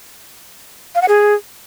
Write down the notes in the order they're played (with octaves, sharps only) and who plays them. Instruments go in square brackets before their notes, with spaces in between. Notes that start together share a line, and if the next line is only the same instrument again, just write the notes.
[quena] F5
F#5
G#4